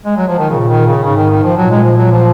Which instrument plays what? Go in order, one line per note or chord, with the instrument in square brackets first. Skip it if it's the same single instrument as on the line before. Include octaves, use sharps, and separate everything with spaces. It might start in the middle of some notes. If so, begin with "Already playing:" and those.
[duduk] G#3
F#3
F3
D#3
[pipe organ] A#2 [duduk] C#3
[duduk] D#3
C#3
[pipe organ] G#2 [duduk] C#3
[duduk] D#3
D#3
F3
[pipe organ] A#2 [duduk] F#3
[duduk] G#3
F3
F#3
F3